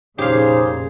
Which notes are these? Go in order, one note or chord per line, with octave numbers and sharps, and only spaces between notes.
F1 A#2 C#3 D#4 G4 G#4 C5 F5